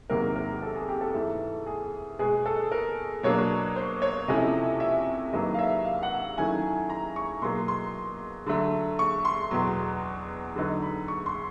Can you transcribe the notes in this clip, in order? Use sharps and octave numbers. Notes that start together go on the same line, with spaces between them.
E2 C3 D#3 F#3 A#3 A#4
A#4
A4
G#4
G4
A4
G#2 E3 A3
G#4
B2 G#3 B3 G#4
A4
A#4
B2 F#3 A#3 D4 C#5
C5
C#5
C3 F3 A3 C#4 E4 D#5
E5
G2 D#3 F#3 A#3 D#5
F5
E5
F5
F#5
D#3 F#3 A3 C#4 E4 G#5
A#5
C#6
B2 F#3 A#3 C6
C6
D3 F#3 A3
C#6
C6
E2 B2 F#3
D3 F#3 B3 D#4
B5
C#6
C6